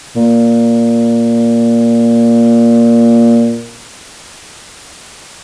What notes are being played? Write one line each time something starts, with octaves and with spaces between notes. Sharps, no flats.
A#2